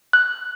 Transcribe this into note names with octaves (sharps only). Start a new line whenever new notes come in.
F#6